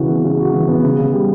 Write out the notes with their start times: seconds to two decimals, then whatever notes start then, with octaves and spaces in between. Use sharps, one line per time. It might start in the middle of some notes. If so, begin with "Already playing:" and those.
Already playing: C#3 E3 F#4
0.09 B3
0.24 C#3
0.39 F#4
0.53 E3
0.68 B3
0.83 C#3
0.99 C#3
1.13 G3